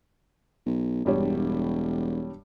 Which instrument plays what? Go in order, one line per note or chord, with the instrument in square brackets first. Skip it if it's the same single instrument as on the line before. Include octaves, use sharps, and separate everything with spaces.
[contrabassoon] B1
[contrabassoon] E1 [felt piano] G2 G3 C#5